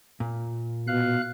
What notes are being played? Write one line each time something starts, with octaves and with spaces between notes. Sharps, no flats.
A#2
B2 F5 F#6